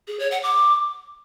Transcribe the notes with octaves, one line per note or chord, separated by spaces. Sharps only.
G#4
C#5
F#5
D6